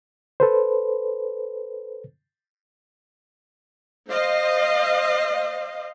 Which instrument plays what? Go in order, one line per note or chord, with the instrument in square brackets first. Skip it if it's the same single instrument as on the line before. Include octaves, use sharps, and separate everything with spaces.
[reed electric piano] A4 B4 C5
[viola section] C5 D#5 F5